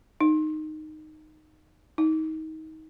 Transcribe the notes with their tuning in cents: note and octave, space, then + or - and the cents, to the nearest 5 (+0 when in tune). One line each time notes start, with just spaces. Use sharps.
D#4 -10
D#4 +25